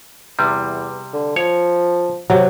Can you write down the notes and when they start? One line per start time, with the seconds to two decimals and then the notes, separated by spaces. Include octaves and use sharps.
0.39 E2 C3 G3
1.13 D3
1.36 F3 C#5
2.30 C3 F#3